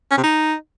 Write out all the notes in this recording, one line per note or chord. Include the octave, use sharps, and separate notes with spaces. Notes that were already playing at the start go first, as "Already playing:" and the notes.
C#4
C3
D#4